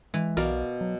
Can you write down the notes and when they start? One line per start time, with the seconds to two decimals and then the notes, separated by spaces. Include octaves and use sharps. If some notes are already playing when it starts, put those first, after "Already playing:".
0.14 E3 G#3
0.37 B1 B2 A#4 D5 F5
0.81 F#3